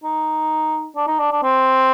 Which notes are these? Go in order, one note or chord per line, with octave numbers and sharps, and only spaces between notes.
D#4
D4
D#4
D4
D4
C4